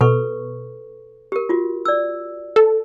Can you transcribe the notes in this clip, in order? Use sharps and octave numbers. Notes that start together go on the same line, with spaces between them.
B2 A4 B4 C#6
G4 A#4
F4 F#4
D5 E6
A4